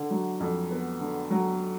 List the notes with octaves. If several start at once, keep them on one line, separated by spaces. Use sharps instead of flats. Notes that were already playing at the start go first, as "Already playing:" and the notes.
Already playing: D3
F#3
F2
B3
D3
F#3